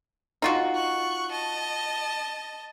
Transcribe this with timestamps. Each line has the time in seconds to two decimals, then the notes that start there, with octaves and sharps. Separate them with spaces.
0.42 D#4 F4 F#4
0.75 C#6 F#6
1.31 D#5 A5